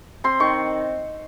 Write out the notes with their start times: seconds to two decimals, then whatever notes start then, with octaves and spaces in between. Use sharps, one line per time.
0.24 C4 C6
0.40 D#3 C#6